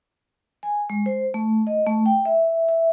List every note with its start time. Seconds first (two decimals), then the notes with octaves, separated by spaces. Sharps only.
0.63 G#5
0.90 G#3
1.06 C5
1.34 A3
1.67 D#5
1.87 A3
2.06 G5
2.25 E5
2.69 E5